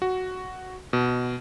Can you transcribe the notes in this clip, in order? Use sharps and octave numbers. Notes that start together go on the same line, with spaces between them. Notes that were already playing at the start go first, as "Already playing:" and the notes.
F#4
B2